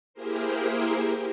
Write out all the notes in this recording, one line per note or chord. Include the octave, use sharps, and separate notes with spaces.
A#3 E4 G4 G#4 A#4 C5